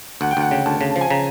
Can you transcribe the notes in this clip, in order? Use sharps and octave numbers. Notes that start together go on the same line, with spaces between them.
D2 F#5
G5
D2 F#5
C#3 G5
D2 A5
C#3
A5
F3
G#5
C#3 A#5